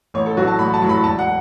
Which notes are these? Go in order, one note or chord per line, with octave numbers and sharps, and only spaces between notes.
A1 C#5
A4
A2 F#3 F#4
A5
A1 B5
A5
A2 F#3
B5
E1 A5
F#5